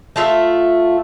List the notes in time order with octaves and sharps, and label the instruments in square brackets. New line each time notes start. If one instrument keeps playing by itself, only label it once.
[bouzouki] A3 F4 E5